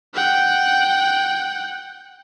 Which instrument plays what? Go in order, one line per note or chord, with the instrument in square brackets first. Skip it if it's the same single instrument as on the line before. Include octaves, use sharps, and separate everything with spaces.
[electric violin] F#5 G5